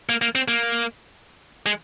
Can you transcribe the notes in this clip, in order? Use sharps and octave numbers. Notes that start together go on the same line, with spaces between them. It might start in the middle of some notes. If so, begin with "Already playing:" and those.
A#3
A#3
C4
A#3
G#3